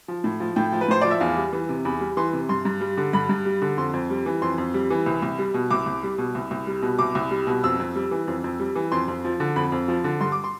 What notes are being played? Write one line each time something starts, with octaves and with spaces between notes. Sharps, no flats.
F3
A2
F3
A2 G5
F3
B4
A2 C5
F3 D5
E5
E2 F5
G3
E3
C3
E2 B5
G3
E3 C6
C3
G2 C6
G2
G3
D3
G2 B5
G2
G3
D3
F2 C6
F2
G3
E3
F2 C6
F2
G3
E3
C2
C2
G3
B2
C2 D6
C2
G3
B2
C2
C2
G3
B2
C2 D6
C2
G3
B2
F2 E6
F2
G3
E3
F2
F2
G3
E3
F2 C6
F2
F3
D3
F2 B5
F2
F3
D3
G2 C6
D6
C6